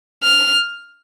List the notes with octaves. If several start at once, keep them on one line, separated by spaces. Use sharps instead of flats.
F6